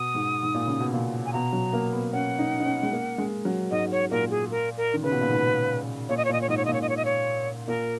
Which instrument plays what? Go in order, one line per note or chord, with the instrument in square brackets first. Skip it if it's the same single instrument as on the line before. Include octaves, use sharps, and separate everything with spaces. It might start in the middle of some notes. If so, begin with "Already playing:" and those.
Already playing: [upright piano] B2 [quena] D#6
[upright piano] G#2
G#2
A#2
C#3
B2
A#2
[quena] G#5
[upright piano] B2 [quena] A#5
[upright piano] F#3
A#3
B3
[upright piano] C#4 [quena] F#5
[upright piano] D#4
D#4
C#4
G#3
A#3
G#3
F#3
[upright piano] G#2 [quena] D#5
[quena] C#5
[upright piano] A#2 [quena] A#4
[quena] G#4
A#4
A#4
[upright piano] D#3
[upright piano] C#3 [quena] B4
[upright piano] B2
A#2
G#2
[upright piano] A#2 [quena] C#5
[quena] D#5
C#5
[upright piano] A#2 [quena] D#5
[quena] C#5
[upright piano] G#2 [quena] D#5
[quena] C#5
D#5
[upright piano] A#2
[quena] C#5
D#5
C#5
D#5
C#5
[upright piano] A#2 [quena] A#4